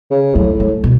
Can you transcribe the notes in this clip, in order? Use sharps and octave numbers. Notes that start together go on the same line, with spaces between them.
C#3
A2 F#3
A2
G#3
B2